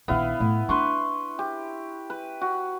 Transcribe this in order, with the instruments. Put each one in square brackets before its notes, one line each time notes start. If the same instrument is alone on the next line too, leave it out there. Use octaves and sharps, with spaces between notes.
[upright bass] A#1 D#3 [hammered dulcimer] B3 E4 F5
[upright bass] A2 [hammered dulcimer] E4
[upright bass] D4 [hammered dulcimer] B4 C6 C#6
[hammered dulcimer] G4
B4
F#4